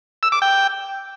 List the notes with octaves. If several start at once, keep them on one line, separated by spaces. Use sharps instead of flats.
E6
D6
G5